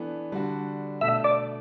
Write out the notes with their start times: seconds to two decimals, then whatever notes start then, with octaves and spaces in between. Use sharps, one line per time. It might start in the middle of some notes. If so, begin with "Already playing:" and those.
Already playing: E3 B3 D4 A4
0.32 D3 G3 D4 F#4
1.01 B2 A3 D4 E5
1.24 D5